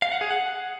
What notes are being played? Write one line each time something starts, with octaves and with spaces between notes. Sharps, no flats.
F5
F#5
G#4
F#5